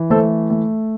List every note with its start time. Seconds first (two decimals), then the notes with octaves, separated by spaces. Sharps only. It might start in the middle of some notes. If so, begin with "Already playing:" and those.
Already playing: E3
0.10 A3 A4 C5
0.50 A3